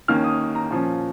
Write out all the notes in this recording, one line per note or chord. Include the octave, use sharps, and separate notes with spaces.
D#2 D#3 A#3 C#4 F6
D#6
A#5
A#2 F3 C#4